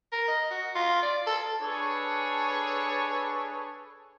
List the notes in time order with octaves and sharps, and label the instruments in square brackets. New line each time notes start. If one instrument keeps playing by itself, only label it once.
[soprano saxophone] A#4
D#5
F#4
F4
D5
A4
[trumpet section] D4 G#4 A4 B4 C#5 C#6